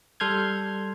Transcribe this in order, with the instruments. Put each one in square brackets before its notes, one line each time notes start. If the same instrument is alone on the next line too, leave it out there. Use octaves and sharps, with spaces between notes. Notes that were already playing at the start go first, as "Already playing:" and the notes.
[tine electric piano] G3 A4 C6 F6 G6 G#6